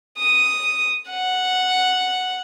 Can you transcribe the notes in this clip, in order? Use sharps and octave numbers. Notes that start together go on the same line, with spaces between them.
D#6
F#5